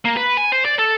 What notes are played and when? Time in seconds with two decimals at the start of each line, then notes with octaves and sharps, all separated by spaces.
0.05 A#3
0.17 B4
0.37 G#5
0.52 C5
0.65 D5
0.79 A4